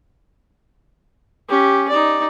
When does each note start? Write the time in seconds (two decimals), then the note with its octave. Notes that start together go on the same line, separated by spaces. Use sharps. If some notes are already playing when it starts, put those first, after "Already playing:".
1.49 C#4 G4
1.89 D#4 D5